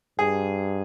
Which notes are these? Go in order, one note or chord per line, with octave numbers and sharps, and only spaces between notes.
G2 G#4